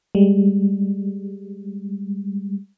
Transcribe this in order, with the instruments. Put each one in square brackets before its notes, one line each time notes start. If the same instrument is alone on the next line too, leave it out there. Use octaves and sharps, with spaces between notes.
[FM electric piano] G3 G#3